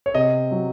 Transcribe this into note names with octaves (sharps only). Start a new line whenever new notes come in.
C#5
C3 D#5
F#3